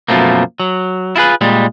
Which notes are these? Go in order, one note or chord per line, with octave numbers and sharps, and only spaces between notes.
F#2 B2 F3 A3 A#3
F#3
E4 F4 G#4 B4
A#2 G3 G#3